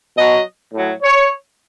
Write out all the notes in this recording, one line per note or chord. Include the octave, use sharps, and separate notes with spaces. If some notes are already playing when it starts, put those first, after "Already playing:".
B2 F#3 D#5
A2 F#3
C#5